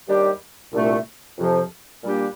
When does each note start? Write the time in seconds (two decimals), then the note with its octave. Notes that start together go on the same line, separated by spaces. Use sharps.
0.07 D#2 D#3 G3 D4 G4
0.72 C2 A#2 A3 D4
1.37 F2 C3 F3
2.02 A#2 G3 A#3 D4 G4